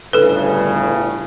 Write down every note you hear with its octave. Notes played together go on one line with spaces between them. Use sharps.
G1 A2 C#3 A4 B4